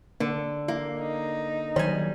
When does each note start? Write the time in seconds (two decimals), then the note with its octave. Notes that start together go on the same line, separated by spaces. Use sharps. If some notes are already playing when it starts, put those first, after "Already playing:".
0.20 D3 A#3
0.68 A#3 E4
0.99 D#4
1.76 D#3 F#3 G3 C5 C#5 G#5